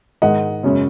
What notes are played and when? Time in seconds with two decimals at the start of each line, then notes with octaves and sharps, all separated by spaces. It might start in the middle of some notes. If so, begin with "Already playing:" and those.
0.22 G#2 D#3 G#3 D#5 F#5
0.63 F#2 C#3 G#3 C#4